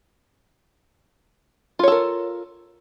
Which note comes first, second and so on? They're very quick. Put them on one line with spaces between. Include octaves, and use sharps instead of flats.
F4 C#5 A4 A#4